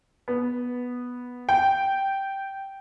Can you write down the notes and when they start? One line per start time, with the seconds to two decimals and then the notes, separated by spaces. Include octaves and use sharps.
0.28 B3
1.49 G5